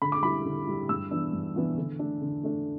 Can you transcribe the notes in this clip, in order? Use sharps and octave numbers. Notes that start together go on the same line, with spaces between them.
D3 B5
D6
G3 E4 B5
D3
G3 E4
G2 E6
E3 B3 D4
G2
E3 B3 D4
D3
A3 D4
D3
A3 D4